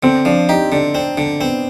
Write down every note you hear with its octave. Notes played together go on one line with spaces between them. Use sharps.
D3 C4
F3 D4
D#4 G4
D3 D4
C4 D4
D3 D4
B3 C4